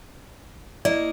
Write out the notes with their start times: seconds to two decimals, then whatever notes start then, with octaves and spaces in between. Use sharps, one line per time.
0.85 A#3 E4 D5 D#5